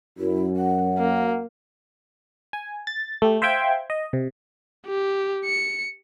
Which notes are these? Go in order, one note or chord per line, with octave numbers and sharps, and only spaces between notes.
F#2 E4
F#5
A#3
G#5
A6
A3 G4
C5 E5 F5 G5 G6 G#6
D#5
C3
G4
C#7